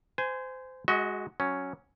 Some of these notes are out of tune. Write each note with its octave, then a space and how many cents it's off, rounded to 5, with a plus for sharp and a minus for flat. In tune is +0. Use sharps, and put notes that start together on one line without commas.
C5 -25 G#5 +0
G#3 +0 F#4 +0 D#5 +40
F#3 +0 C#4 +0